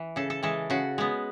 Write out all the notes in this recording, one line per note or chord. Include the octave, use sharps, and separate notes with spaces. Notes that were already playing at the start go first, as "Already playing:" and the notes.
Already playing: E3
C#3 A4
A4
E3 G#3 A4
C#3 F#4
G#3 B3